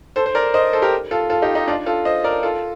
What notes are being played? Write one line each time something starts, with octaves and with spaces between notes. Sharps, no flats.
A4 C5
C5
A#4 D5
C5 D#5
A4 C5
G4 A#4
F4 A4
F4 A4
D#4 G4
D#4 G4
D4 F4
F4 A4
C5 D#5
A#4 D5
F4 A4